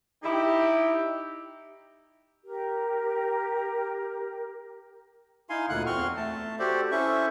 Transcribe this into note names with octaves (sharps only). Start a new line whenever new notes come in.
D#4 E4 G4
G4 A#4
D#4 E4 F5 G#5 C6
D2 A#2 D3 F#5 F#6
E2 C4 C6 C#6 F6
A3 A5
F#4 G4 A4 C5 D5
C#4 E4 A4 C5 E5 C#6